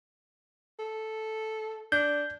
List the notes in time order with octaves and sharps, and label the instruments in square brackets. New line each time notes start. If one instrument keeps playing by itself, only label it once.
[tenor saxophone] A4
[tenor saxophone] D4 [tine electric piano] G6